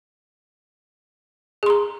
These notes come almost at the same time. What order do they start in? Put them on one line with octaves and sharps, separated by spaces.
G#4 C6 A#5